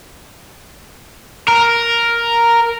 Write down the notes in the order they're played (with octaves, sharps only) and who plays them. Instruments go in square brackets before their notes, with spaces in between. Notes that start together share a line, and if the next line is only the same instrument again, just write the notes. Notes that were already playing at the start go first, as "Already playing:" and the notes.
[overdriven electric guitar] A#4